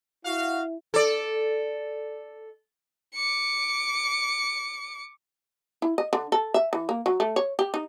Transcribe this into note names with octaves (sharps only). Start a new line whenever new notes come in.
E4 F#4 F5
A4 D5
D6 C#7
E4
D#5
D3
A4
E5
E3
A#3
F#3
A3
C#5
G4
D#4